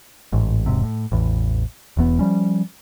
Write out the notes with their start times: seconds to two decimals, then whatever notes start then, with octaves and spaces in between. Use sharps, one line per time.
0.32 A1 G#2
0.66 E1 G#2 C3
0.83 A2
1.12 A1 E2
1.97 E1 E2 B3
2.19 F3 G3 C#4